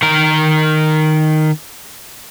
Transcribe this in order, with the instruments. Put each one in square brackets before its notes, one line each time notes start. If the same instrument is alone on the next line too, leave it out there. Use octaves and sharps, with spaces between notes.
[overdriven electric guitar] D#3 A#4